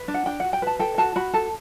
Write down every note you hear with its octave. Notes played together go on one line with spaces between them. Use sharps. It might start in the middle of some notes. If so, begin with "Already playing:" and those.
Already playing: B4
D4
F#5
D4 G5
F#4 F#5
G5
B4 A5
A4 G5
F#4 A5
F#4 B5
A4 A5